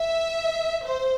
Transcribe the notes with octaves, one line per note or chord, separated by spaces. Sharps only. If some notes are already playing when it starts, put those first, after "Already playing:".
Already playing: E5
C5